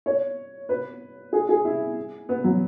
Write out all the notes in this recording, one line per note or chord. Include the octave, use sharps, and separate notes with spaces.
C#5
B4
G#4
G#4
E4
B3
F#3